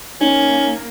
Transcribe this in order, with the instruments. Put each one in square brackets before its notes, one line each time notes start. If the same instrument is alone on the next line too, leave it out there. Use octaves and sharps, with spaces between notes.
[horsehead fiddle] A#3 [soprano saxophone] C#4 [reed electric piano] D#4